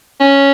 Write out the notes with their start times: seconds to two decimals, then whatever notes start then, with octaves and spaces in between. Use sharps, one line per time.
0.20 C#4